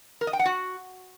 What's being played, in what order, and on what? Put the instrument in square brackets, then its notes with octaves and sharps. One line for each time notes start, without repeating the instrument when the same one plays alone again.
[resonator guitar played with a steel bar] A#4
D#5
G5
F#5
F#4